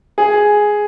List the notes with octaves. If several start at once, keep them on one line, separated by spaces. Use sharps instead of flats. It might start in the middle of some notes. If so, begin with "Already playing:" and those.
G#4